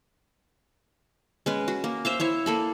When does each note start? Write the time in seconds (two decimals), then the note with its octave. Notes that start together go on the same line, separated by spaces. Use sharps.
1.46 G#3 C#4 B4
1.68 F#4
1.84 A#3
2.05 C5 E5 F5
2.20 E4 C#5 E5
2.46 A#3 A4 B5